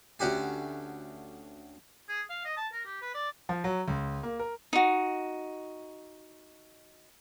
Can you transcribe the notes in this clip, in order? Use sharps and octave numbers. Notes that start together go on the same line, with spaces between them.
D2 C#4 F#4 G4 G#5
G#4
F5
D#5
A5
A#4
G4
B4
D5
F3
F#3
C#2
A#3
A#4
D#4 F#4